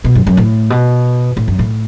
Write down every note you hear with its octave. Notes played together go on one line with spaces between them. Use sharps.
B2
F#2
F#2
A2
B2
A2
F#2
A2